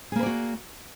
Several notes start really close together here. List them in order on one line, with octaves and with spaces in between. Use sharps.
G#4 A#3 B4 D5 F#4